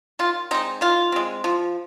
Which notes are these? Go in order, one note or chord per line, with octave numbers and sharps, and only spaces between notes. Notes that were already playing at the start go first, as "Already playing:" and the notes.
D#3 F4
G#3 C4 D#4
D#3 F4
G#3 C4
F3